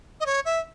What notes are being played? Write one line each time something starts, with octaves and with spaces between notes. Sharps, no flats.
D#5
C#5
E5